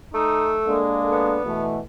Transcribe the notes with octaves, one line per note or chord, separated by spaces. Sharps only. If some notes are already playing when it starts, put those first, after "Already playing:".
A3 D#4
G#3 A#3 D4 A4
B3
B2 E3 A3